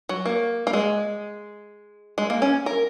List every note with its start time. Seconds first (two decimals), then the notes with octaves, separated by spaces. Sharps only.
0.09 F#3
0.25 A#3
0.67 A#3
0.73 G#3
2.18 G#3
2.30 A#3
2.42 C#4
2.66 A#4